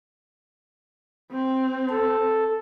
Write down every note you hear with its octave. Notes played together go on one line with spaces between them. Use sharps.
C4
A4